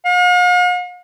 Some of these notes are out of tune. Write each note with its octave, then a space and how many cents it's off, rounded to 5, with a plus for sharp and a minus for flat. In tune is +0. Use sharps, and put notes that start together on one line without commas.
F5 +45